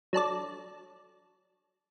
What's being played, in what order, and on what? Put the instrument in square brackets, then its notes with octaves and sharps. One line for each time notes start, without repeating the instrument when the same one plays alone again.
[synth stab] F#3 D4 A4 D5